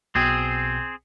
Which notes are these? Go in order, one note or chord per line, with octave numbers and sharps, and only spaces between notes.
B1 B2 C4 G#4 G5